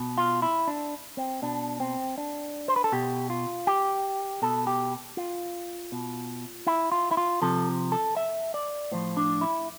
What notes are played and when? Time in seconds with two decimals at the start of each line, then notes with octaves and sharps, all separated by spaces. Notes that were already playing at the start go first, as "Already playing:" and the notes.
Already playing: B2
0.18 F4
0.42 E4
0.68 D4
1.17 C4
1.42 B2 D4
1.80 C4
2.18 D4
2.68 C5
2.76 B4
2.84 A4
2.92 B2 G4
3.30 F4
3.67 G4
4.42 B2 A4
4.67 G4
5.17 F4
5.92 B2
6.67 E4
6.92 F4
7.11 E4
7.17 F4
7.42 C3 F3 A4
7.92 A4
8.17 E5
8.54 D5
8.92 A2 F3 C5
9.17 D4
9.41 E4